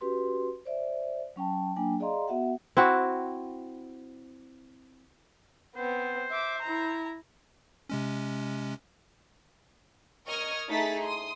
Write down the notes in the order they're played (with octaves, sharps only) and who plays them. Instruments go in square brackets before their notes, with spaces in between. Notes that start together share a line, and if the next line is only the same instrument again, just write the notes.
[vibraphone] C#4 F#4 G4 B4 C6
C5 D5 E5
F#3 C#4 G5 A5
F#3 A#3 D4 G5 G#5
G#4 D5 D#5 F5 A#5 C6
B3 F#4 E5 F#5
[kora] C4 E4 F#4
[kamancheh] B3 C4 [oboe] C5
[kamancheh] E5 D6
E4 A#5
[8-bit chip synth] C3 G#3 C#4
[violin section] A#4 D#5 C#6 D#6 F6 G#6
A3 D#4 E4 G#4 A6 B6
C6 D#6